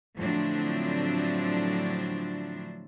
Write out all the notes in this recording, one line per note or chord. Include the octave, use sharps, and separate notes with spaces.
A2 D3 F3 F#3 C4 D4